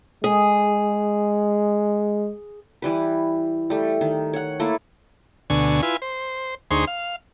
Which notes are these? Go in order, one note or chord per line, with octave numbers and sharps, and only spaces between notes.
G#3 G#4
E3 G3 B4
G3 A3
D#3
C#5 F#5
A3 A#3 E4 A4
D2 B2 D3 G#5 C#6
E4 F4 B4 G#5
C5
D2 D#4 G#4 C5 C6 C#6
F5